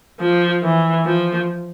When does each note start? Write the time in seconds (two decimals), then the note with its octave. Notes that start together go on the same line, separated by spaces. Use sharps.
0.20 F3
0.63 E3
1.06 F3